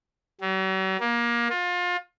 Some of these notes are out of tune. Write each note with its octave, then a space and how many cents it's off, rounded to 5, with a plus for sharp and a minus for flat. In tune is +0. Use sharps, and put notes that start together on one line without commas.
F#3 +45
A#3 +25
F4 +30